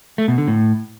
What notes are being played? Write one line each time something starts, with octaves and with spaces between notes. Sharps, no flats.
A3
B2
D3
A2